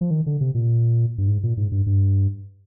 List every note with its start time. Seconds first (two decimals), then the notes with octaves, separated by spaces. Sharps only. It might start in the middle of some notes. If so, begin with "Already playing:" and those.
0.01 F3
0.11 D#3
0.26 D3
0.41 C3
0.54 A#2
1.18 G2
1.28 G#2
1.43 A#2
1.57 G#2
1.72 G2
1.86 G2